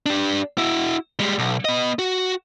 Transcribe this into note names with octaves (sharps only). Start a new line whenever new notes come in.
D4 G4
E4 F#4
G3 G#3
B1
B3 D#5
F#4